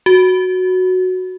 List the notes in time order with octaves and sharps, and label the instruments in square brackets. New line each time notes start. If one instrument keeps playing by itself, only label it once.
[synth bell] F#4